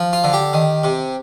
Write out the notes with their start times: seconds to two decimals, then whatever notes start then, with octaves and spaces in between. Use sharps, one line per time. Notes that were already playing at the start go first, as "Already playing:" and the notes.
Already playing: F3
0.13 F4
0.24 D3
0.33 G4
0.53 D#3
0.84 C3